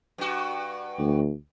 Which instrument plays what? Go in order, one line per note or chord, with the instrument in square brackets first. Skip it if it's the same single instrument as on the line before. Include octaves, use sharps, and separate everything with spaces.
[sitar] G2 F#4
[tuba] D2